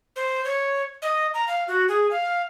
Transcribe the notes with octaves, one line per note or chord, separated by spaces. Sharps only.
C5
C#5
D#5
A#5
F5
F#4
G#4
F5